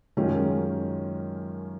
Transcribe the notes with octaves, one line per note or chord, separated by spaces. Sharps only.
F#2 D#3 G#3 C#4 F4